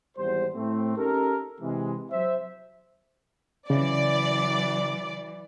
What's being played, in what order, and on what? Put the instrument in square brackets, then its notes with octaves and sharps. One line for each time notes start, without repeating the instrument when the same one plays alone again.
[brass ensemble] G#1 E2 G3 C5
A2 A3 C4
C#4 D#4 G4 A4 A#4
C3 E3 G#3
F#3 C5 E5
[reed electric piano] C#3 [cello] E3 F#3 [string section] D5